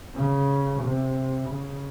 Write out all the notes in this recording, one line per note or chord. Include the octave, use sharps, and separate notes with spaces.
C#3
C3
C#3